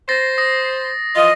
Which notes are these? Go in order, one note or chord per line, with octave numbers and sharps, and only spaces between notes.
C5 A6 A#6 C7
D#6 A#6 C7
E3 F3 F4 D#5